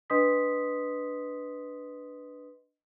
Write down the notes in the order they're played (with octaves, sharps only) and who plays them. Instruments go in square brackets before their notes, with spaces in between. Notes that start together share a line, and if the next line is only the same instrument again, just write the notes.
[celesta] D4 B4 D#5 C6 D#6 B6